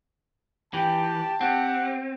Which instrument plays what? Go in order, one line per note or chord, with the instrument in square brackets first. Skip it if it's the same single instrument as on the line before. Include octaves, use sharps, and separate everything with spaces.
[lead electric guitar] E3 [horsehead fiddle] G4 G5 [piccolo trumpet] A5
[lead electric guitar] C4 [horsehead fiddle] G4 [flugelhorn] F#5